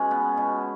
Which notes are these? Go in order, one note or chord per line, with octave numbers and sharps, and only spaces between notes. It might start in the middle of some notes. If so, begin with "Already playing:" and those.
Already playing: B2 G#3 C#4
B3
B2